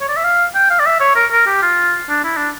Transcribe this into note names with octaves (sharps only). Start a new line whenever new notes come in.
C#5
D5
E5
F5
G5
F5
D5
E5
C#5
A#4
A#4
G4
F4
D4
E4
D4